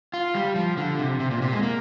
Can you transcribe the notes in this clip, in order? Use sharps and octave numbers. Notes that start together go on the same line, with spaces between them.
F4
G3
F3
D3
C3
C3
A#2
C3
G#3
A#3